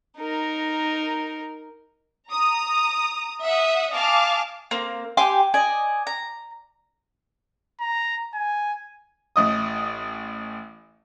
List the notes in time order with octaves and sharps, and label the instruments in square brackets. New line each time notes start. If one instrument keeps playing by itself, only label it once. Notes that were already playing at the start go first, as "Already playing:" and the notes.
[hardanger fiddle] D#4 A#4
[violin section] A#5 D#6
E5 F#5 D#6
D#5 F5 G#5 A5 D6 F6
[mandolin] A#3 C4
G4 G#5 C6 D6
D5 D#5 G#5
A#5
[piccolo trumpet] A#5
G#5
[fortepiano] A1 D#5 D#6